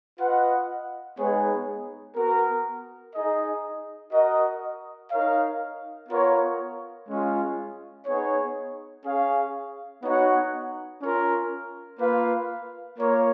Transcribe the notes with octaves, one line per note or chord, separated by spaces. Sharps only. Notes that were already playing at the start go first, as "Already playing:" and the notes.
F4 B4 D#5 F#5
G#3 B3 D#4 G#4 C#5
B3 F#4 A#4
D#4 G#4 D#5
F#4 A#4 D#5
D#4 A#4 C#5 F5
B3 F4 A#4 C#5
G#3 C#4 F4
B3 D#4 G#4 C#5
C#4 G#4 C#5 F5
B3 D#4 F#4 C#5 F#5
C#4 F4 A#4
A#3 F4 B4 F5
A#3 F4 A#4 C#5